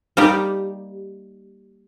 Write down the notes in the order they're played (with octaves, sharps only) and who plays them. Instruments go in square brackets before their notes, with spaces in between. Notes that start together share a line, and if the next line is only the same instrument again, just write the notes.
[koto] G3 A#3 D#4 G4 D5